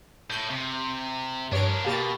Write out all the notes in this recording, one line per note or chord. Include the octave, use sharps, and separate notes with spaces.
A2 G6
C3
G2 D4 A#4 C#5 D7
B2 A#3 G4 A6